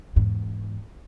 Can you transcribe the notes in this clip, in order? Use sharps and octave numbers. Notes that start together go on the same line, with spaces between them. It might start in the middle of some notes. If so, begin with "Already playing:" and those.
E2 G#2